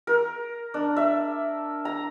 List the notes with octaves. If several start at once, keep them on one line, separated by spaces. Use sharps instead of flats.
A#4
D4
E5
A#5